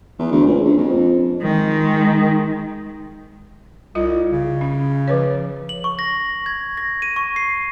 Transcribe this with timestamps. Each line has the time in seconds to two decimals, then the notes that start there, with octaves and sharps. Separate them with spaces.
0.19 E2
0.31 D2
0.46 C#2
0.65 A#1
0.78 F2
1.43 D#3 G#3
3.95 C2 F4 D#5
4.32 C#3
4.61 C#4
5.08 F3 B4 C#5
5.69 F#7
5.84 C#6
5.99 A#6
6.46 G#6
6.77 A#6
7.02 D#7
7.16 C#6
7.36 C7